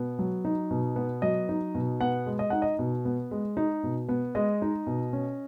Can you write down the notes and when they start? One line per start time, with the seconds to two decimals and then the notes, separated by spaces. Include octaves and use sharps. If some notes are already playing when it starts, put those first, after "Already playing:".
Already playing: B2 B3
0.19 F#3
0.45 D#4
0.71 B2
0.96 B3
1.22 F#3 D#5
1.49 D#4
1.75 B2
2.01 B3 F#5
2.26 G#3
2.39 D#5
2.50 D#4 F#5
2.62 D#5
2.79 B2
3.05 B3
3.31 G#3
3.57 D#4
3.84 B2
4.09 B3
4.35 G#3 D#5
4.62 D#4
4.87 B2
5.13 C#4